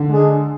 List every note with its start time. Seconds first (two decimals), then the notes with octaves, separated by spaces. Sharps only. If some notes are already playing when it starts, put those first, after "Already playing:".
Already playing: D3
0.09 G#3 D4 G#4